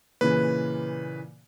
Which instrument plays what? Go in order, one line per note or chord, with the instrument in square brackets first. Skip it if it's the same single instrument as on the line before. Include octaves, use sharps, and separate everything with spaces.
[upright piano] A#2 C#3 E3 [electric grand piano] B4